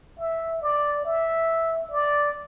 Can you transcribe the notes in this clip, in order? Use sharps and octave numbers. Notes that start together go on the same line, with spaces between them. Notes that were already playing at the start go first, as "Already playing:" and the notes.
E5
D5
E5
D5